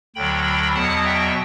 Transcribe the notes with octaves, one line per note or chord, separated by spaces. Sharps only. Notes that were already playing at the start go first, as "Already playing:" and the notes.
D2 D3 F#3 G5 B5
E2 B2 F#3 F#5 A5
E5 G5